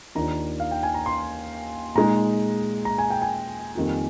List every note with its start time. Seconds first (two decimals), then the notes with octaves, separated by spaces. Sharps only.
0.15 D#2 D#3 A#3 D4 F4 A#5
0.60 F5
0.71 G5
0.83 G#5
0.94 A#5
1.06 C6
1.95 A#2 G#3 D#4 A#5
2.85 A#5
2.98 G#5
3.10 G5
3.22 G#5
3.75 F2 D#3 G3 A#3 F4